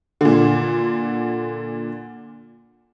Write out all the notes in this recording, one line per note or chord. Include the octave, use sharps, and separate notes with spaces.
A#2 D3